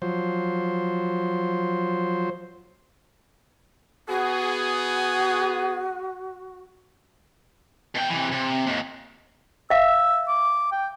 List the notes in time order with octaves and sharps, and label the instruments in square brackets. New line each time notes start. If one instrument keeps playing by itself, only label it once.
[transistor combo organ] F3 F#3 C5
[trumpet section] B3 G#4 [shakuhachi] F#4
[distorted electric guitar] B2 G5
C3 E3
C3
D#2 G#2
[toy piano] E5 F5 [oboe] E6
[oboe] D6
G5